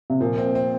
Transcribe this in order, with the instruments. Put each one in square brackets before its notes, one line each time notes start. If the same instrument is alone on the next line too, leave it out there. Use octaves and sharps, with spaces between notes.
[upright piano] C3
[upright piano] A#2 [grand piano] F3
[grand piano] C4
C4